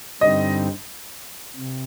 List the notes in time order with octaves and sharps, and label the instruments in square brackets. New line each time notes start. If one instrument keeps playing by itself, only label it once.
[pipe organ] G2 D3 G3 C4 D#4 [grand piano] D#5
[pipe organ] C3